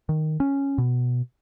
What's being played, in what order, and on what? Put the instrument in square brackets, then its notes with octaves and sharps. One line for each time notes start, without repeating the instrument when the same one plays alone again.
[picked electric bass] D#3
C#4
B2